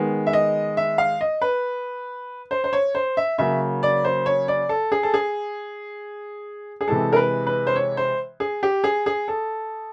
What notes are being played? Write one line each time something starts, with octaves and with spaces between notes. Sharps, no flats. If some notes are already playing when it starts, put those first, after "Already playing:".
Already playing: D#3 G#3 B3
E5
D#5
E5
F5
D#5
B4
C5
C5
C#5
C5
E5
C#3 F#3 A#3 E5
D5
C5
C#5
D5
A4
G#4
A4
G#4
G#4
C3 E3 G#3 A4
A#4
B4
B4
C5
C#5
C5
G#4
G4
G#4
G#4
A4